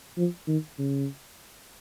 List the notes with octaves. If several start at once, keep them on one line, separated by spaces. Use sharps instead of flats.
F3
D#3
C#3